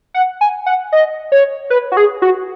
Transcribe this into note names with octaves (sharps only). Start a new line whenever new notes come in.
F#5
G#5
F#5
D#5
C#5
B4
F#4
G#4
F#4